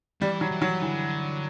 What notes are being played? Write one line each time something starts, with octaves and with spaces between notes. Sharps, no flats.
E3 G3
F#3
E3
F#3
D3 E3